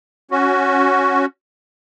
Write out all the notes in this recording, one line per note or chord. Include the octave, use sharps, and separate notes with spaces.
C#4 F#4